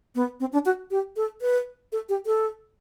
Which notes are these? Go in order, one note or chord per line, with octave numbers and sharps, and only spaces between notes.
B3
C4
D4
F#4
G4
A4
B4
A4
G4
A4